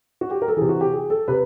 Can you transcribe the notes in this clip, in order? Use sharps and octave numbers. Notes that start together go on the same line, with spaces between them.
F#4
G4
A#4
A4
C3 E3 G#4
F#4
G4
G#4
A4
C3 B4